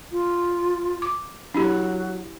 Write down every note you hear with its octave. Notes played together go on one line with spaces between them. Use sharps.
F4
D6
F#3 D4 E4 G4